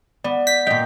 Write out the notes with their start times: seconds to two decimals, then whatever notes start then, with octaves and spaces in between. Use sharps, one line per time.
0.24 B3 D5
0.47 G6 B6
0.67 A#2 D#5 G5 G6